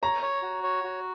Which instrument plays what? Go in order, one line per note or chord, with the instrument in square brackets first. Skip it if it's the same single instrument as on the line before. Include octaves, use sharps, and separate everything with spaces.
[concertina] C#5 [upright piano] A#5
[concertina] C#5
F#4
C#5
F#4